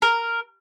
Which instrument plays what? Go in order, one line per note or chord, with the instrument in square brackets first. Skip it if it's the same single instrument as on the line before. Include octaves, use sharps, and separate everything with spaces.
[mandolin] A#4